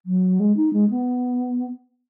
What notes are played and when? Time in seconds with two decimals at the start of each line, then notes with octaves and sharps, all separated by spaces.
0.06 F#3
0.40 G#3
0.57 D#4
0.73 G#3
0.90 B3